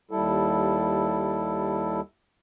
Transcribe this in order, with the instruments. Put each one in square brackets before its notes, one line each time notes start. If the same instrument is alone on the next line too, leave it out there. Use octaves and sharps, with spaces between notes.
[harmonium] D#2 G3 E4 A4